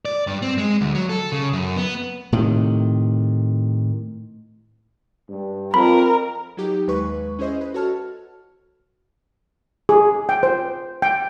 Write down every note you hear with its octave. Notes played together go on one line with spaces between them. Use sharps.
D5
G2
C4
G#3
D2
F#3
A4
C#3
F#2
B3
A2 C3 D#3
G2
F2 A#4 B5
F#3 D#4 G4
D#2 G#3 B4 C#6
C#4 E4 G#4 C5 D#5
B4
F#4 A4 C#5 A5 F6
G#4
G5
C5
G5